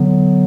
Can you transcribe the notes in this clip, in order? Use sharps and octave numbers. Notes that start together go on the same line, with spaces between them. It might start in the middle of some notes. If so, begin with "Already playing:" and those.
Already playing: D3 F#3 B3